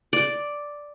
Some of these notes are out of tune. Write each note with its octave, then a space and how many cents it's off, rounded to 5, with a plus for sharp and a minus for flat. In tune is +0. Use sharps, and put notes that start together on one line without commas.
D5 +0